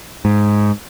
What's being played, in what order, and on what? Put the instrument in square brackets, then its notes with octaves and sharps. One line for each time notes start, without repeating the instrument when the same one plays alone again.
[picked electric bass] G#2